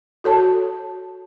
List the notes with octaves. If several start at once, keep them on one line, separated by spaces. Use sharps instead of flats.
F#4 A4 C#5 A5